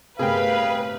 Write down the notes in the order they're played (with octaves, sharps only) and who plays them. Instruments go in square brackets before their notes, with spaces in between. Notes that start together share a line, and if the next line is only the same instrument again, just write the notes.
[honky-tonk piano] G1 A2 C3 [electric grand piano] G#4 A#4 G5 [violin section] B4 [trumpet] F5